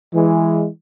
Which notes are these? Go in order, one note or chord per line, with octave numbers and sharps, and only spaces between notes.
E3 G#3